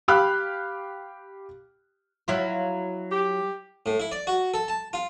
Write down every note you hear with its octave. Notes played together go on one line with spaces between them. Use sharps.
G4 F5 G5 B5 F6 F#6
F#3 E4 F4
G4
A2
E4
D5
F#4
A4
A5
F4